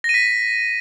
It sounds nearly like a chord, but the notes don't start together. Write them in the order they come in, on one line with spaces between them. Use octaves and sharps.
A#6 D#7 B6